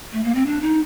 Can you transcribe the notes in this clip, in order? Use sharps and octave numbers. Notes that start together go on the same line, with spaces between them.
A3
A#3
C4
D4
D#4